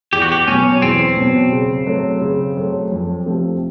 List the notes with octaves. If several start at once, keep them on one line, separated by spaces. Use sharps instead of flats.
E2 G4
F#4
G4
B2 F#3 C#4
E2 C4
B2 F#3
C#3
F#3 A3
C#3
F#3 A3
F2
C3 F3 A3 C4